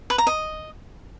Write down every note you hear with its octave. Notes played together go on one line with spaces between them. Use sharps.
B4
A#5
D#5